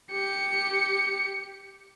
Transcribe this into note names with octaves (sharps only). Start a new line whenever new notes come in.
G4 C#7